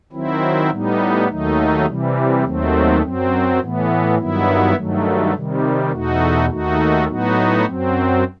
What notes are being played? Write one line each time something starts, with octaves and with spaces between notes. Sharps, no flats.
D#3 F#3 C4 E4
A2 G3 B3 D#4
D#2 D#3 F#3 A3 D#4
C3 E3 G3
D#2 D#3 F#3 A3 C4
F#2 F#3 C4
A2 E3 B3
G2 D#3 F#3 B3 E4
G2 D#3 F#3 A3
C3 D#3 G3
E2 B2 A3 D#4 F#4
D#2 D#3 A3 D#4 F#4
A2 F#3 B3 D#4 F#4
F#2 F#3 C4